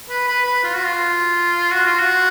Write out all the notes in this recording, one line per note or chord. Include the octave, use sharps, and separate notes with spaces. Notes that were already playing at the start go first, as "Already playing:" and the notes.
B4
B4
B4
F4
F#4
F4
F#4
F4
F#4